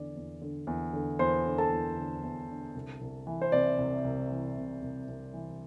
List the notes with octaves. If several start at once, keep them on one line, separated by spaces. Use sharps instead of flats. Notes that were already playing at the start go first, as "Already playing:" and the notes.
Already playing: E2 D3 D5
E2
D3
E2
D3
E2 C5 C6
D3
A4 A5
E2
D3
E2
D3
C2
C2
E3
C5
C3 D5
C2
C2
E3
C3
C2
C2
E3